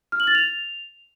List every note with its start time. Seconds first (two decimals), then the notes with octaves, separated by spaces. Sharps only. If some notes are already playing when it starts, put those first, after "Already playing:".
0.12 F6
0.20 F#7
0.27 A6
0.35 F7